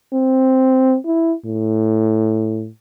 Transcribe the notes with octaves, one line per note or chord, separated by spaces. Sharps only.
C4
E4
A2